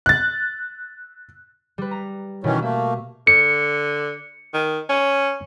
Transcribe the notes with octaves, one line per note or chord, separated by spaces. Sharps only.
F#6 A6
G3 B4
A#5
B2 D#3 E3 C#4
A3 A#3 E5
D3 C#7
D#3
C#4